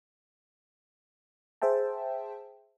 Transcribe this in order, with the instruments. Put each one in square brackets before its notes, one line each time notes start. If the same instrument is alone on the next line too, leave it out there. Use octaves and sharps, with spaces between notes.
[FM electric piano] G#4 C5 E5 G5 A5